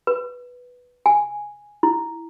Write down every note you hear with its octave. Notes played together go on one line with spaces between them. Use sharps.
B4
G#5
E4